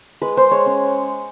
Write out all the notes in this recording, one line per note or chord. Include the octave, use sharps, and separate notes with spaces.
G#3 B4
G#3 C5
G#3 C#5
C#4